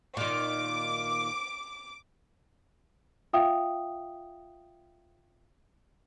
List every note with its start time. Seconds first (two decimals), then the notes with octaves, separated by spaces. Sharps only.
0.17 A#2 D#3 D6
3.33 F4 E5 F5 G5 D#6